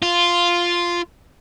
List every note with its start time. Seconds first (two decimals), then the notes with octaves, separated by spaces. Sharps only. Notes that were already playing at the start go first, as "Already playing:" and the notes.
0.03 F4